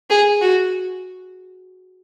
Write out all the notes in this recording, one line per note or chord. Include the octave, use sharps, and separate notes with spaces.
G#4
F#4